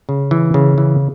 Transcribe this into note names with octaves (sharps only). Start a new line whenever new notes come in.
C#3
E3
C#3
E3